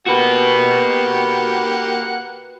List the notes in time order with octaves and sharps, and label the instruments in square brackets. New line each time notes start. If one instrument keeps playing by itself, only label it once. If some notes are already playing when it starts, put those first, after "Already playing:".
[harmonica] A#3 G4 F#5 [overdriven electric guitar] F#4 B4